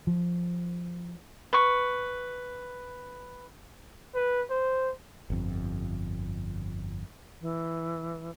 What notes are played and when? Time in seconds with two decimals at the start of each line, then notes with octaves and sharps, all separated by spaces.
0.07 F3
1.53 B4 C#6
4.15 B4
4.50 C5
5.30 G1 F2
7.41 E3